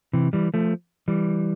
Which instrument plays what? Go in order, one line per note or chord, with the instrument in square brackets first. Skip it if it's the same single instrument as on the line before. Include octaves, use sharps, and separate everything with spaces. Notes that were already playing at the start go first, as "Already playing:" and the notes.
[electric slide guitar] C3 E3
E3 G3
F3 A3
E3 G3